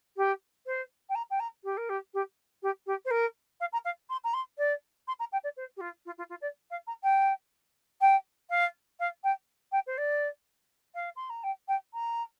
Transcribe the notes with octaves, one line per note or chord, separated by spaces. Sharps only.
G4
C5
G5
A#5
G5
A#5
G4
A#4
G4
G4
G4
G4
C5
A#4
F5
A#5
F5
C6
A#5
C6
D5
C6
A#5
G5
D5
C5
G4
F4
F4
F4
F4
D5
F5
A#5
G5
G5
F5
F5
G5
G5
C5
D5
F5
C6
A#5
G5
G5
A#5